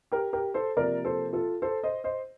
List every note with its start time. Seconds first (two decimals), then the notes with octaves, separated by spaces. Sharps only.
0.12 G4 A#4
0.33 G4 A#4
0.54 A4 C5
0.76 C3 F3 A#3 A#4 D5
1.05 A4 C5
1.33 F4 A4
1.62 A4 C5
1.83 C5 D#5
2.04 C5 D#5